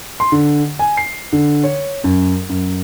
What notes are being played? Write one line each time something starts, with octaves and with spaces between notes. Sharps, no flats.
C6
D3
G#5
C7
D3
C#5
F#2
F#2